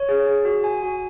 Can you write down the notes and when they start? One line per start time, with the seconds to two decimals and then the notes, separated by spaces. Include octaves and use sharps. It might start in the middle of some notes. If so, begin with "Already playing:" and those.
Already playing: C#5
0.09 G#4
0.26 G#4
0.45 F#4
0.64 G#5
0.83 F#4